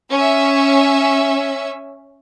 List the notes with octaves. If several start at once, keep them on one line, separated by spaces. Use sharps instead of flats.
C#4 E5